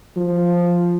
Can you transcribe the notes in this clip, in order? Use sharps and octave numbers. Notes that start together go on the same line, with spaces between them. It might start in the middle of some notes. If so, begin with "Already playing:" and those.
F3